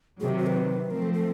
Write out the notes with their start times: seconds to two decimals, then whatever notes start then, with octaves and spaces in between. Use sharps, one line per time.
0.20 C3 D#3 F#3 G#4
0.28 G4
0.38 F#4
0.47 B4
0.90 F3 A3 C4 A#4
1.02 A4
1.13 A4